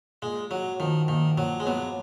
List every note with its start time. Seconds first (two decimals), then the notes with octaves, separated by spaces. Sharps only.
0.22 A#2 G#3
0.51 F#3 F#4
0.80 D#3 F3
1.08 A#2 D#3
1.37 A#2 F#3
1.60 G#3
1.66 F#3 B3